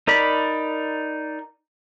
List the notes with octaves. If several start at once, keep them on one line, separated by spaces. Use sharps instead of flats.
D#4 A#4 D5 B5